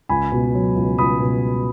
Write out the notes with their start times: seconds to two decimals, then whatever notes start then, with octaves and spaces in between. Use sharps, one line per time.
0.09 C#2 G#5 B5
0.32 B2
0.54 F#3
0.76 C#2
0.98 C#2 B5 D#6
1.20 B2